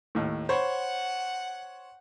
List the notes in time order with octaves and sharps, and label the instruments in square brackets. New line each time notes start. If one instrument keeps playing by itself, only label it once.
[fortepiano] D#2 A2
[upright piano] C5 C#5 [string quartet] F#5 [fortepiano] B5